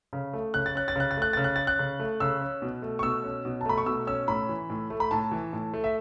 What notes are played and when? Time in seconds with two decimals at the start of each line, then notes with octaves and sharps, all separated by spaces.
0.13 C#3
0.33 A3
0.54 C#3 F#6
0.66 A6
0.75 C#4 F#6
0.88 A6
0.96 C#3 F#6
1.11 A6
1.17 A3 F#6
1.33 C#3 A6
1.44 F#6
1.56 C#4 A6
1.67 F#6
1.79 C#3
2.00 A3
2.20 C#3 E6
2.41 C#4
2.62 B2
2.82 A3
2.99 C#6
3.03 B2 E6
3.24 C#4
3.45 B2
3.61 A5
3.66 A3 B5
3.78 C#6
3.86 B2 E6
4.07 C#4 E6
4.28 A2 B5
4.49 E3
4.70 A2
4.90 A3
5.00 B5
5.11 A2 A5
5.32 E3
5.53 A2
5.74 A3
5.84 E5